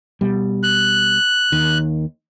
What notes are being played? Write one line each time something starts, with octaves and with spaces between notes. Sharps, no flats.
B2 G3
F#6
D#2 D#3